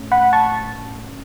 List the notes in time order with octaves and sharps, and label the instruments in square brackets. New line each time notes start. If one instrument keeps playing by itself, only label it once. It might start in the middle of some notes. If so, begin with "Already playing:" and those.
Already playing: [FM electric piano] A2 A3 C#4
F#5 B5
A5 C#6